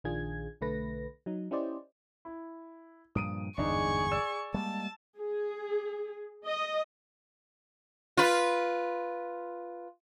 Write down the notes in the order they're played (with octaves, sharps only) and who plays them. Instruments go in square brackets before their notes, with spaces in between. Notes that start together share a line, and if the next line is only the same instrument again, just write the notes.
[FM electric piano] A#1 D#3 D4 F4 G#4 G#6
B1 D3 A3 B4 A#6
F#3 D#4
C#4 E4 G4 C5 D5 D#5
[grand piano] E4
[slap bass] G2 A#2 F3 [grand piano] D#6 D7 D#7
[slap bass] G1 E2 G#2 [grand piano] D4 D#4 [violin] G#4 C#6
[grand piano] D5 E6 E7
[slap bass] G3 G#3 A#3 [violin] A5
[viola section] G#4
D#5
[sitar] F4 B4